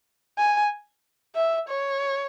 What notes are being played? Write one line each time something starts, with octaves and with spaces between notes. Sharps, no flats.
G#5
E5
C#5